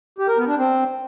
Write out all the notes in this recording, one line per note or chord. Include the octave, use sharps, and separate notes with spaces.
G4
A#4
B3
D4
C4